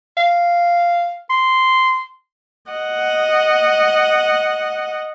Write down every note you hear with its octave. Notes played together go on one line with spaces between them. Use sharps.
F5
C6
D#5 F#5